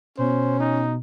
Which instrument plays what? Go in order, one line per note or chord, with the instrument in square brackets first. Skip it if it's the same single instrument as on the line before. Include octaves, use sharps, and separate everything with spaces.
[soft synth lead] B2 [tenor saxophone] C#4 [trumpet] C5
[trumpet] D#4